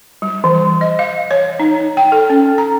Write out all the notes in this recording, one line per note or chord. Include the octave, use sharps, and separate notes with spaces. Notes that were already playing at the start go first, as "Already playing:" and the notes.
G3
E3
D#5
F5
C#5
D#4
G5
A4
C#4
A#5